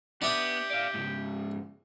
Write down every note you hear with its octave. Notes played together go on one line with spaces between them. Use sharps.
B3 D4 G4 E5 D#6
D5 F5
G#2 C#3